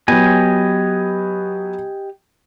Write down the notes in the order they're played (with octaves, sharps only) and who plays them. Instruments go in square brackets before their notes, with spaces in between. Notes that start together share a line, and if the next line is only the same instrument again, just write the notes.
[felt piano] F#3 B3 [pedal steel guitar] G4 D#5 G#5